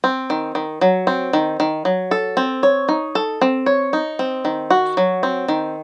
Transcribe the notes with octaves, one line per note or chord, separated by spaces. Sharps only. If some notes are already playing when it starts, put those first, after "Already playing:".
C4
D#3
D#3
F#3
C4
D#3
D#3
F#3
A4
C4
C#5
D#4
A4
C4
C#5
D#4
C4
D#3
F#4
F#3
C4
D#3